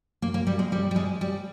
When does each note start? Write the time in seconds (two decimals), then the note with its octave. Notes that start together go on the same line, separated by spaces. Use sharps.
0.22 A#3
0.34 A#3
0.47 G3
0.59 G#3
0.72 G3
0.91 G3
0.96 G#3
1.21 G3